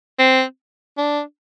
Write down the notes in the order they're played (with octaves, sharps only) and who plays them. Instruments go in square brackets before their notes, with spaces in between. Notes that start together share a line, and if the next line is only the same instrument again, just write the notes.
[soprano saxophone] C4
D4